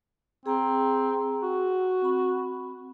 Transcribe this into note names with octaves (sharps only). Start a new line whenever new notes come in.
C4 G#4 A#5
F#4
C4 B5